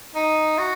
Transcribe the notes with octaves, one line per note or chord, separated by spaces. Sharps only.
D#4
F#4